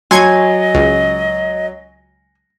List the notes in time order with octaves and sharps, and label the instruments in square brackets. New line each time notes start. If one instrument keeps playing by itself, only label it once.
[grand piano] F#3 [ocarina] D#5 [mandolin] G#5 [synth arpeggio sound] C6 C#6 G#6
[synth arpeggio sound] C#2